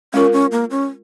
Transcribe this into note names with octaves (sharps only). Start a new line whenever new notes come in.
G#3 C#4 F4 A#4
C#4
A#3
C#4